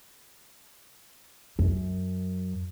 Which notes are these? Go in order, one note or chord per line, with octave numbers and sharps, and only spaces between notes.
F#2